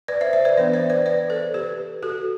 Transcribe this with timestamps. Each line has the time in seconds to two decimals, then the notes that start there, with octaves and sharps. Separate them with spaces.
0.08 B4 D5
0.21 C5 E5
0.33 C5 E5
0.45 B4 D5
0.57 E3 B3 D4 B4 D5
0.73 C5 E5
0.90 B4 D5
1.06 B4 D5
1.30 A4 C5
1.54 G4 B4
2.03 F#4 A4